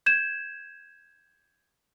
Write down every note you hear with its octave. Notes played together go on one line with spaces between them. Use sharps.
G6 G#6 E7